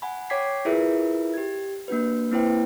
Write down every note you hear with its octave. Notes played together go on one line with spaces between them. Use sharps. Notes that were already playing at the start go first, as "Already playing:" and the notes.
F#5 G#5 B5
C#5 G5 D6 G#6 B6 C7
E4 F4 G#4 A#4 B4 E5
G4 G#6
A#3 D4 F#4 B4
A#3 C4 E4 B4 C5 G5